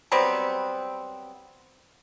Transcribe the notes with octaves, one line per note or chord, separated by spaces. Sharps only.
F#3 G3 B3 C4